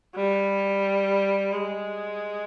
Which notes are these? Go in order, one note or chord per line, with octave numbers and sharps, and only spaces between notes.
G3
G#3